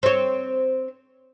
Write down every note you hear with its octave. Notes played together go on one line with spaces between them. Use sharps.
C4 C#5